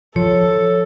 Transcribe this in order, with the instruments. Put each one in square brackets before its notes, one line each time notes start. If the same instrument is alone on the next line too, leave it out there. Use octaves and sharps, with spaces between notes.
[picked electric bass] F3 [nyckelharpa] A4 [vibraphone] C#5